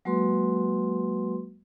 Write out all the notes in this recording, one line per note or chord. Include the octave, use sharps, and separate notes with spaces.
F#3 G#3 A#3 F#4 B4 C6